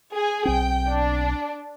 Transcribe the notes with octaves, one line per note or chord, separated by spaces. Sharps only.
G#4 G#5
B1 C4 G5
D4